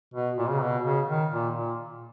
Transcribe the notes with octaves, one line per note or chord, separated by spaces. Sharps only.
B2
A#2
C#3
B2
C#3
D#3
A#2
A#2